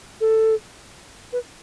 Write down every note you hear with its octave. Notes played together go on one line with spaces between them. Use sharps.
A4
B4